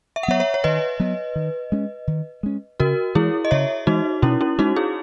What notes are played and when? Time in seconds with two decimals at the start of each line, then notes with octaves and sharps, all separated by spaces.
0.16 E5
0.23 F#5
0.28 F#3 B3 C#5 E5
0.40 C#5 E5
0.54 C#5
0.64 D#3 B4 D#5
1.00 F#3 B3
1.36 D#3
1.72 G#3 C#4
2.07 D#3
2.43 G#3 C#4
2.80 C#3 F#4 A#4
3.15 E3 G#3 E4 G#4
3.45 D#5
3.51 C#3 C#5 E5
3.87 E3 G#3 D#4 F#4
4.22 B2 C#4 E4
4.41 C#4 E4
4.59 G#3 C#4 D#4 F#4
4.76 E4 G#4